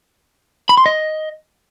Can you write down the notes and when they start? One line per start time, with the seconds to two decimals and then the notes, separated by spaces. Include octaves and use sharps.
0.69 B5
0.77 C6
0.86 D#5